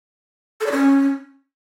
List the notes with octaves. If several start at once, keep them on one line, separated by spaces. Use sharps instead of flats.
A4
D5
C#4